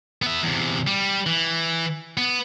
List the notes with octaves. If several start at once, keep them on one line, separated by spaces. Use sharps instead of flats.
B3 E5
E2 C3
G3
E3
B3